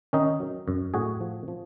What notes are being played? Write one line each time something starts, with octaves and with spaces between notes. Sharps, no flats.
D#3 C#4 D#4
F#3
F#2
A2 F#4 G#4
F3
F3